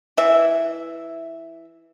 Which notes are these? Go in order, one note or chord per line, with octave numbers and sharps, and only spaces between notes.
E3 E5